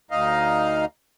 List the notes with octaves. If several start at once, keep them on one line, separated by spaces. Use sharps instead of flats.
D2 D#4 D#5 F5